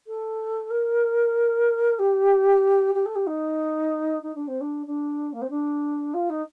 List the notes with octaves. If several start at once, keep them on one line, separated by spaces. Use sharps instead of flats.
A4
A#4
G4
G4
A4
G4
D#4
D#4
D4
C4
D4
D4
A#3
C4
D4
F4
D#4